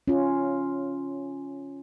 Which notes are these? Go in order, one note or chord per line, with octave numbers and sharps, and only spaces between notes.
C#4 F4